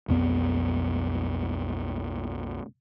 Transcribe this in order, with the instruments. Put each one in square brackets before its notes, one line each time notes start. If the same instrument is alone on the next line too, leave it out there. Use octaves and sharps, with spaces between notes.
[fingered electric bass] B1 F2 B3